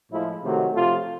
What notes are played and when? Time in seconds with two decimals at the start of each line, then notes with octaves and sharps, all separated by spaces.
0.11 A2 F3 G#3 E4
0.42 C3 D#3 F#3 A3
0.73 C3 F3 A3 F4